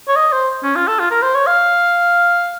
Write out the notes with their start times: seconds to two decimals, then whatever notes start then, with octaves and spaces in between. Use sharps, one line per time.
0.08 C#5
0.16 D#5
0.32 C5
0.63 C#4
0.76 F4
0.88 A4
0.99 F4
1.11 A#4
1.23 C5
1.35 C#5
1.47 F5